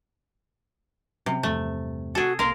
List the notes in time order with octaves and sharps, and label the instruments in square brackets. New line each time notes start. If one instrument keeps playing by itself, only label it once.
[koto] C3 [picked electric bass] F#3 C4 C#4
[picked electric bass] E2 G2 F3 [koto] A3
[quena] F#4 [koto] G#4 A4
[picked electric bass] B1 A#3 [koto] A#4 F5 [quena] C6